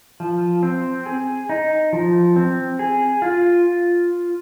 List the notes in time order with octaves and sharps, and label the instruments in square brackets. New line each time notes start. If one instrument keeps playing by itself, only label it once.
[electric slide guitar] F3
C4
G#4
D#4
F3
C4
G#4
F4